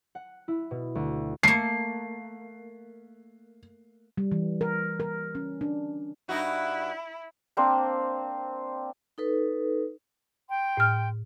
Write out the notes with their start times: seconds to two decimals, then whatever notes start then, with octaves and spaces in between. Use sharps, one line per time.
0.15 F#5
0.48 E4
0.71 B2
0.95 D2
1.43 A3 A#3 C7
4.17 G3
4.32 E3
4.61 A#4
5.00 A#4
5.35 C#4
5.61 D4
6.29 G2 D#4 E4 F#4
7.57 A#3 C4 D4 C5
9.18 D#4 A4 B4
10.49 G5 C6
10.77 A2 F6